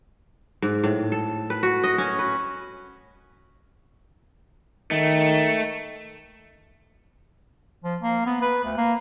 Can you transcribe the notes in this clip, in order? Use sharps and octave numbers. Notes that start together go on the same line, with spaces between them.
G#2
A2
A4
B4
F#4
D#5
C#4
B4
D#3 A3
F3
A#3
B3
B4
D2
A#3